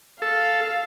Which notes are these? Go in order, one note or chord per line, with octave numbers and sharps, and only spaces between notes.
A4 F5